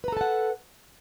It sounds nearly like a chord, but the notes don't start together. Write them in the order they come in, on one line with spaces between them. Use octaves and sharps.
B4 A#5 A4 A5 F#5